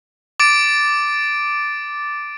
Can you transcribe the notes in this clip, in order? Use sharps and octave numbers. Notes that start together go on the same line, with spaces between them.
D6 A6 D7